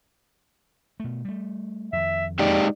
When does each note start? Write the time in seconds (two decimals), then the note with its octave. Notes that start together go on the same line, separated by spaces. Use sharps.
1.00 B2 A3
1.25 G3 A3
1.93 F2 D#3 E5
2.39 G#3 D#4 G4 D5